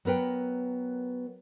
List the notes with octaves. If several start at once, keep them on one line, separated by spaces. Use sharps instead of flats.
F#3 B3 A#4 B4 G5